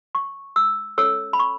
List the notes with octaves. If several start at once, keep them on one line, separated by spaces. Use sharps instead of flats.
C#6
E6
C#4 A4 C#5 E6
B5
C#6